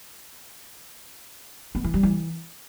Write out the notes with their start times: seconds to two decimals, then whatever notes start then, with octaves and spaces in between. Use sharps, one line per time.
1.75 B3
1.84 E3
1.94 G3
2.03 E3